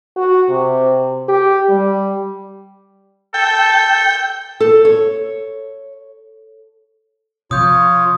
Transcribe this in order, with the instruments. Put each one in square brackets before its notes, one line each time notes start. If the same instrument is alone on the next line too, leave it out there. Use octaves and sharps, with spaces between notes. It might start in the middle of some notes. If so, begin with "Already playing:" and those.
[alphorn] F#4
C3
G4
G3
[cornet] A4 [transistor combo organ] G5
[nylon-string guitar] A4
C#5
[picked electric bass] C3 F3 [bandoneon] F4 C#5 [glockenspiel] D#6 G6